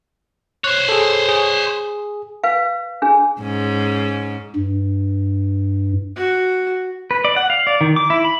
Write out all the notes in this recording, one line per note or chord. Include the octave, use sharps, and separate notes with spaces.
C5 C#5 F#6
G#4 A4
G#4
B4 F5
D4 G#4
G#2 C#4
G2
F#4
B4
D5
F#5
F5
D5
D#3
D6
E4
B5